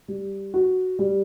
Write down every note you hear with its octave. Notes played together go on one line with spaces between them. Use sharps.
G3
F#4
G3